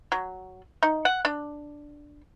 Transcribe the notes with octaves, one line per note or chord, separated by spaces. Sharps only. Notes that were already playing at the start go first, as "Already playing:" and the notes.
F#3
D#4
F#5
D4